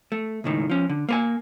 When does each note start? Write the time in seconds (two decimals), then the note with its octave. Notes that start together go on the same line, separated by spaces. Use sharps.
0.12 A3
0.44 C#2 A2 D#3
0.70 F3 C#4
0.89 D3
1.09 A#3 B4 G#5